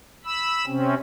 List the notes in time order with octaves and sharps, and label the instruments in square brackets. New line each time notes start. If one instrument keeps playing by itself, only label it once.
[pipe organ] B5 E6
C3 C4 C#4